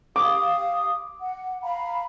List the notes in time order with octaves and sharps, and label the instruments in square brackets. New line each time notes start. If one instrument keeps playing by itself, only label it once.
[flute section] G4 F5 D#6 [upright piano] D6
[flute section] F#5
F5 A#5 B5